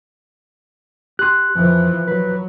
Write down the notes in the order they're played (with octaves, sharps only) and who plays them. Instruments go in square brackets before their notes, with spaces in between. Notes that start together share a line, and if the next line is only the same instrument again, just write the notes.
[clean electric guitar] G4 C6 [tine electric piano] F#6
[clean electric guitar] F2 [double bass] E3 F3
[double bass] F#3 [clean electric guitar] B4